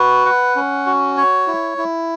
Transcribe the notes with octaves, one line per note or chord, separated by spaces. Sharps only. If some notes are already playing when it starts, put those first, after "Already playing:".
Already playing: F#4 B4
F#5
C#4
F#4
C#5
E4
E4